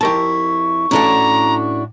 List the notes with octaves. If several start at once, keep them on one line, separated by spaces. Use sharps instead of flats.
F2 E4 G4 A#4 A5 C#6
A2 C#4 D4 E4 F#4 A4 A#5